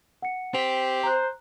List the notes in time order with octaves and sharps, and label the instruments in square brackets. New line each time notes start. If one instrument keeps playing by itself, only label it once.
[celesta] F#5 C#7
[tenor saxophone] C4 [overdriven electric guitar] G4 [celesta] B6 F7
[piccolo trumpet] C5 [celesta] A#5 F#6